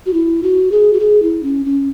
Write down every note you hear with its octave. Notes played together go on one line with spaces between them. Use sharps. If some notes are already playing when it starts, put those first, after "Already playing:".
F#4
E4
F#4
G#4
F#4
G#4
E4
C#4
C#4